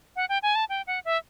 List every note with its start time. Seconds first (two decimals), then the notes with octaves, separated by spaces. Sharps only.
0.16 F#5
0.29 G5
0.42 G#5
0.55 A5
0.69 G5
0.87 F#5
1.05 E5